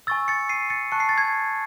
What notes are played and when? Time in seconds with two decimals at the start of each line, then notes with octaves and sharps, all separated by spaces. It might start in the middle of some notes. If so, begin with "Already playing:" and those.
0.07 G#5 C#6 E6 A6
0.28 A6 C#7
0.49 C7 D#7
0.70 A6 C#7
0.92 A5 C#6 F#6 C#7
1.00 C7
1.09 A6
1.18 G#6 C7